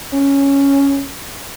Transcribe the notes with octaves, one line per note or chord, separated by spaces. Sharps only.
C#4